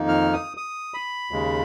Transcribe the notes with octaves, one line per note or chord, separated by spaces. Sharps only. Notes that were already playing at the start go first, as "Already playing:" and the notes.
Already playing: F2 D#3 A#3 D#4
F6
D#6
D#6
B5
D#2 C#3 G#3